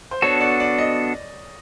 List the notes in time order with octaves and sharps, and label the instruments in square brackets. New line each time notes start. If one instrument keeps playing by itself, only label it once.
[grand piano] C5
[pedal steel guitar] B3 D4 F#4 A4 [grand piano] C#5
[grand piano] D5
D5
D#5